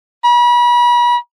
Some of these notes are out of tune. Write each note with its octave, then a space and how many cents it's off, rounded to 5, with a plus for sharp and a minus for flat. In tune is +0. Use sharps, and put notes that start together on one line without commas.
B5 -40